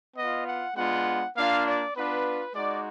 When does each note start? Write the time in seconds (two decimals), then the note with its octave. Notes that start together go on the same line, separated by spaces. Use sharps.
0.17 B3 F4 D#5
0.47 F#5
0.76 G#3 B3 D4 F4 F#5
1.36 A#3 D4 F4 F5
1.66 D5
1.95 B3 D4 F4 B4
2.55 G#3 D#4 F#4 D5